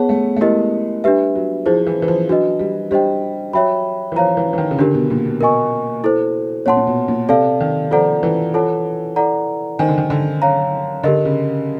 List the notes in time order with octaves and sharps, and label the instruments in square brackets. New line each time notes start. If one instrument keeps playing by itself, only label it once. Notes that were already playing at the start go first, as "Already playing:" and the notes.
Already playing: [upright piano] B3 [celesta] G#4 C#5 F#5 A5
[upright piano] A3
A3
[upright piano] G#3 [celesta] E4 G4 A#4 D#5
[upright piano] G3 [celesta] D4 G4 B4 E5
[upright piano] F#3
[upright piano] F3 [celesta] E4 G#4 C5
[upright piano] E3
E3
F3
[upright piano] F#3 [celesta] D4 F#4 B4 D#5
[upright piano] G3
[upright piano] G3 [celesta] D4 G4 C5 D#5 G5
[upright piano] F#3 [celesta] C#5 E5 G5 B5
[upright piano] E3
[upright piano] F3 [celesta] C#5 F5 A#5
[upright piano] E3
E3
D#3
C#3
[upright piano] D3 [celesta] D4 G4 A#4
[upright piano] B2
A#2
B2
[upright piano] B2 [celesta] A#4 D#5 G#5 C#6
[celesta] E4 A4 C5
[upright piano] A#2 [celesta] C#5 F#5 A5 C6
[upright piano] A#2
B2
A#2
[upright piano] C3 [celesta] A4 D5 F5 A5
[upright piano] D#3
[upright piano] F3 [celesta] F4 A4 D5 F#5 A#5
[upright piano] E3
[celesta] F4 A4 C#5 F#5 A5
E4 A4 D5 F#5 A#5
[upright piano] D#3 [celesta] C5 D#5 G#5
[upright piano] D3
D#3
D3
[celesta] C#5 F5 A#5
[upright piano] D3 [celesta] G4 A#4 D#5
[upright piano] C#3